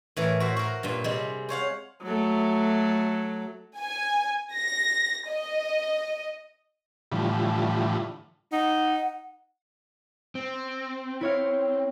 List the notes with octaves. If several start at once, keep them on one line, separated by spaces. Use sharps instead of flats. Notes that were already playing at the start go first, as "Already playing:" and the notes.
A2 E3 A#4
F#4 C5 E5
F#4 A#4
G2 A#2
C3 G3 G#3
C5 C#5 F5 F#5
F#3 A3
G#5
A#6
D#5
A2 D3 E3 F3 G3
D#4 F#5
C4
E4 C#5 F5